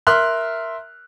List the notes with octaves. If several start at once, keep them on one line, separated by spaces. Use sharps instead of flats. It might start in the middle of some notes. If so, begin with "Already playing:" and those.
A#4 E5 C6 F6 F#6